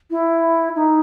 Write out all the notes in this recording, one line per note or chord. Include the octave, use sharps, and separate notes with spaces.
E4
D#4